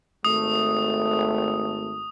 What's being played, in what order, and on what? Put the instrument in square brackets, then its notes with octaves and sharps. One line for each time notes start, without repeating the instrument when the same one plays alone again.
[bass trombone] G#1 [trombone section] A3 [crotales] D#6